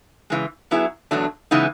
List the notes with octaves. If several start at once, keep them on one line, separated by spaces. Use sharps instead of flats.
C#3 E3 G#3
F#3 B3 E4 G#4
E2 B2 F#3 A3 D4
C#3 E3 G#3 B3 D#4